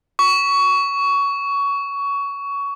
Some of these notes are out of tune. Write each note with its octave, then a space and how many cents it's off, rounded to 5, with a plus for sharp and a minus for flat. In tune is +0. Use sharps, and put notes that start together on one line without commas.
C#6 +20